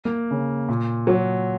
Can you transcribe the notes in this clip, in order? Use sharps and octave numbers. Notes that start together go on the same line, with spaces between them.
A#3
C#3
A#2
F#3